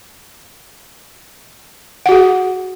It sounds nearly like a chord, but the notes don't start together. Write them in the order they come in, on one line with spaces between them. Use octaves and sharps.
F#5 F#4 G#4